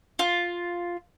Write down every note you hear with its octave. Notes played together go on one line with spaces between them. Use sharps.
F4